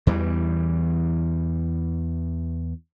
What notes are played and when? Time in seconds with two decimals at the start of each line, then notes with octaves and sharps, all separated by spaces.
0.07 E2 E3 G3